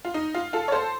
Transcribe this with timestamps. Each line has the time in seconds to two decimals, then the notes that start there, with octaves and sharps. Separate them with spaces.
0.05 F4
0.14 D#4
0.34 F4
0.53 F4 A4
0.68 C#5
0.72 A4 C5